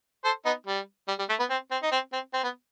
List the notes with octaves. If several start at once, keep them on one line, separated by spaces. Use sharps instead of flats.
A4 C5
B3 D#4
G3
G3
G3
A3
B3
C4
C4
D#4
C4
C4
C4
B3